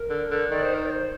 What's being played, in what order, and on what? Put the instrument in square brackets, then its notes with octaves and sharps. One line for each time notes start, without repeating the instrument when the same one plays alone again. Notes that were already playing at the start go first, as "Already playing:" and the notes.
Already playing: [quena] A#4
[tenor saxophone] D3
D3
[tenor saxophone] D#3 [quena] D5
[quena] C5
A#4
D5
C5